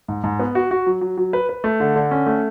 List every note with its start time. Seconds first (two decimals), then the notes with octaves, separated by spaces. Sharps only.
0.08 G#2
0.24 G#2
0.40 B3
0.55 F#4
0.71 F#4
0.86 F#3
1.01 F#3
1.17 F#3
1.33 B4
1.49 B4
1.64 A3
1.80 D3
1.96 D3
2.11 C#4
2.26 A3